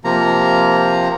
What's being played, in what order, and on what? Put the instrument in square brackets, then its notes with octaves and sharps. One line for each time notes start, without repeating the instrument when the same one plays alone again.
[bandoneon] C3 F3 A#3 A#5